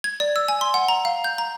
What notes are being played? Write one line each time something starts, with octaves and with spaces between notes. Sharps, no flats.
G#6
D5
E6
G#5
C6
F#5
A#5
F5
G6
A#5